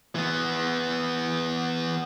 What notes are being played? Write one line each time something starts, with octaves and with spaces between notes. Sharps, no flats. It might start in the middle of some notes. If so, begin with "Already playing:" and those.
E3 B3